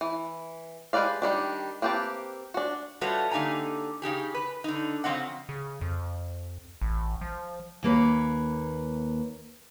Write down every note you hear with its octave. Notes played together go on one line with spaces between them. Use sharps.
E3
G#3 G4 B4 D5 F5
D#3 F#3 G3 D4
A#3 C4 G4 B4 A5
D4 F#4
G3 A3 F4 F#4 B4 C#5
D3 A#3 D#4 G4 G#5 A#5
C#3 D#4 G4 G#4
B4
D3 D#4
C#3 F3 C4 D#5 F#5
C#3
F2
A1
F3
D#2 A#3 B4 C#5